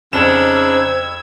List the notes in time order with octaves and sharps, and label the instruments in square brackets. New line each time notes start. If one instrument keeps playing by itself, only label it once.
[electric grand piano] F2 E7 [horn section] C#3 D4 D#4 [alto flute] C5 [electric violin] E6 G#6